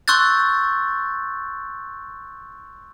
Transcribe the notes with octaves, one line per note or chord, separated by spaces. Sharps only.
C6 C#6 E6 F#6 G6 A6